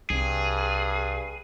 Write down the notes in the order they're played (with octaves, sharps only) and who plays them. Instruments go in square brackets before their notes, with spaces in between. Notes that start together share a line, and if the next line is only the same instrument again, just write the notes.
[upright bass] C2 [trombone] G2 [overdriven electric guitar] G#4